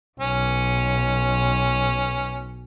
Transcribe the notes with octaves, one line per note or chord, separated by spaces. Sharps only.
B1 C#4